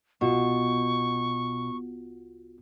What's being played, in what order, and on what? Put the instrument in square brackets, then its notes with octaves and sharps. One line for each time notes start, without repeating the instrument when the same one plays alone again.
[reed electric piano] C2 F4 F#4 [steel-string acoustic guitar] B2 [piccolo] C#6